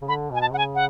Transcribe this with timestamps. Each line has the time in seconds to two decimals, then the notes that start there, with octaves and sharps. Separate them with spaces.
0.02 C#3
0.08 D3 B5
0.30 B2 G#5
0.41 A5
0.53 C#3 F#5
0.58 G#5
0.75 F#5